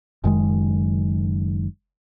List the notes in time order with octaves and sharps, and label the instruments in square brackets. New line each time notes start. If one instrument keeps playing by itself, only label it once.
[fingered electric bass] F#1 F#2 D#3 G#3